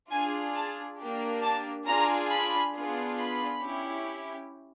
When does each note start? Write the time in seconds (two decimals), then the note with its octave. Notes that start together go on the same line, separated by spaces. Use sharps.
0.10 D4 F4 G#4 G#5
0.55 A5
0.98 A#3 D4 G4
1.43 A5
1.86 D4 F4 G#4 A#5
2.31 B5
2.75 B3 D4 F4 G#4
3.19 B5
3.63 C#4 E4 G4